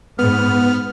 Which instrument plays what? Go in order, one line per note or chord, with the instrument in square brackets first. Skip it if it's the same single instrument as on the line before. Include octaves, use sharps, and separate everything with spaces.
[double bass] G#2 [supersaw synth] B3 [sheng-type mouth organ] F6